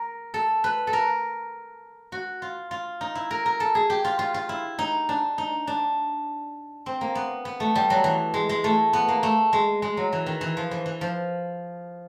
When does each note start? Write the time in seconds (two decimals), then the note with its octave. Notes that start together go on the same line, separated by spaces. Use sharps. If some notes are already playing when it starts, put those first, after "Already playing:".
Already playing: A#4
0.34 A4
0.64 B4
0.87 A4
0.93 A#4
2.12 F#4
2.42 F4
2.71 F4
3.01 D#4
3.15 E4
3.31 A#4
3.46 A#4
3.60 A4
3.75 G#4
3.90 G4
4.04 F4
4.19 F4
4.34 F4
4.49 E4
4.79 D#4
5.09 D4
5.38 D#4
5.67 D4
6.86 C4
7.01 A#3
7.15 B3
7.45 B3
7.60 A3
7.76 G3
7.90 F#3
8.04 E3
8.34 G#3
8.49 G#3
8.64 A3
8.93 B3
9.08 A#3
9.23 A3
9.53 G#3
9.82 G#3
9.97 F#3
10.13 E3
10.26 D#3
10.41 E3
10.57 F3
10.71 E3
10.86 E3
11.01 F3